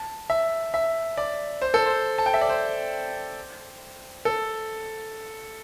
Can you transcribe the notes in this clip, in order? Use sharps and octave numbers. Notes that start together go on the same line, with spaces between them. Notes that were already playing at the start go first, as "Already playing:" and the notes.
Already playing: A5
E5
E5
D5
C5
A4
C5
A5
G5
E5
D5
C5
A4